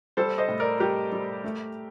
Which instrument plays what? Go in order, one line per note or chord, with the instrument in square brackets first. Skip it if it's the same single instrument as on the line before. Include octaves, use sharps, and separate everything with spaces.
[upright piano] G3 A4 C5
C5 D#5
A2
A#4 D5
G3 G4 A#4
G3
A3